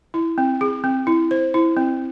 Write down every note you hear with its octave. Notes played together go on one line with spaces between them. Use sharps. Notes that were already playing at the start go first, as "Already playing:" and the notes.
E4
C4
G#4
C4
E4
C5
E4
C4